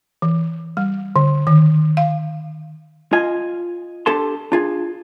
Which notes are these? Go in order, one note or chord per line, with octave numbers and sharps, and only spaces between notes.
E3
G3
D3
D#3
F5
F4 D#5 G#5
D4 G4 A4 A5 C6
D4 F4 G#4